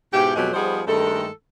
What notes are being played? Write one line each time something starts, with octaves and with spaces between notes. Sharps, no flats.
G#2 B2 E4 G4
F2 B2 F#3 G#3 G4 G#4
F3 G3 B3 D#4 G#4 C5
G2 D#3 G#3 A3 A4